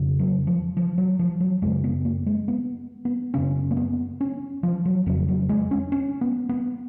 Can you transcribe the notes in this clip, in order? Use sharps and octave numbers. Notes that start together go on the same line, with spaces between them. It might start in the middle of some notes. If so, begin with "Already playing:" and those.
Already playing: F2 C#3
F#3
F3
F3
F#3
F3
F#3
F#2 C#3 G#3
B3
A#3
G#3
B3
B3
F#2 C#3 C#4
A#3
B3
C#4
F3
F#3
F2 C#3 F#3
F#3
G#3
C#4
C#4
B3
B3